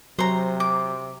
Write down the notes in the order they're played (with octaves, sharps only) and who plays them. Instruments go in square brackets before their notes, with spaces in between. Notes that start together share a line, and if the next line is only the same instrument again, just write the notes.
[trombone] C3 [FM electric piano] F#3 [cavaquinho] C5 A#5
[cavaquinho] D6